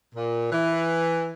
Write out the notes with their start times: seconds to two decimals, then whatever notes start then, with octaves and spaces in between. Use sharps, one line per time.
0.15 A#2
0.52 E3